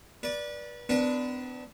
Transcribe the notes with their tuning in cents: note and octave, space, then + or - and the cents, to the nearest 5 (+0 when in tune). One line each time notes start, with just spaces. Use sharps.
B4 -30 D5 +0
B3 +45 D4 +0 B4 -40